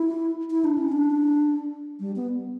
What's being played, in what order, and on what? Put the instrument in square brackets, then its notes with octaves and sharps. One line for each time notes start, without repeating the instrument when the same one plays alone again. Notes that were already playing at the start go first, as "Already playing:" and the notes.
Already playing: [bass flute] E4
E4
D4
C#4
D4
G3
B3